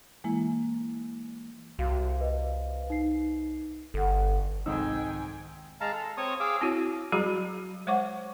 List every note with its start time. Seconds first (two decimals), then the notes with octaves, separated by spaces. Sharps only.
0.24 E3 G#3 A#3 E4
1.79 C2 F#4 F5
2.21 B4 D#5 F5
2.90 D#4 C7
3.94 G1 A4 F#5
4.66 C2 F2 G#2 D#3 D#4 G5 G#5 E6
5.81 G#3 F5 A5 A#5
5.93 A4
6.17 C4 C#5 C#6 D#6
6.40 G#4 F5 D6 E6
6.61 C4 E4 F#4 C#5
7.12 F#3 G3 F#4 G#4 A#5 B5
7.87 G#3 C5 C#5 F#5 C#6 D6